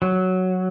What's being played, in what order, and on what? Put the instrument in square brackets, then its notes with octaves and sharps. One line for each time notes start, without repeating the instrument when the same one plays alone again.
[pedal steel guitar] F#3